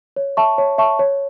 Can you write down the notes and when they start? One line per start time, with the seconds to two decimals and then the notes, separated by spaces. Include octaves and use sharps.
0.16 C#5
0.37 E5 A5 C#6
0.58 C#5
0.78 E5 A5 C#6
0.99 C#5